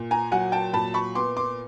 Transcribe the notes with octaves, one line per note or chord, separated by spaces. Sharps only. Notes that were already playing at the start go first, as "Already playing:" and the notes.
Already playing: A#2
G#5 A#5
F#3 F#5 G#5
G5 A5
A#2 A5 B5
B5 C#6
B3 C6 D6
C6 D6